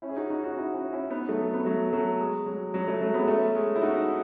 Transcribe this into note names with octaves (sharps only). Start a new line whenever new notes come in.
C#4 E4
G#4
D#4 F#4
D#4 F#4
D#4 F#4
C#4 E4
C#4 E4
C#4 E4
B3 D#4
F#3 A3
B3
F#3 A3
F#3 A3
G#3
F#3
F#3
F#3 A3
F#3 A3
G#3 B3
A3 C#4
G#3
E4
D#4 F#4